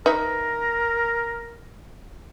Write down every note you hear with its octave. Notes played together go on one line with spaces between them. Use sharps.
D#4 A#4 B4 E5